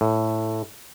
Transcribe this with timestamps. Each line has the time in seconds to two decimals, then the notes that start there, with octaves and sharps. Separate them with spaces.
0.01 A2